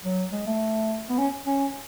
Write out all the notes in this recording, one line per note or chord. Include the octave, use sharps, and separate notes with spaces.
F#3
G#3
A3
B3
C#4
C#4